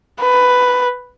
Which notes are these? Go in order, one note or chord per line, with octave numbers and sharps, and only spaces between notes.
B4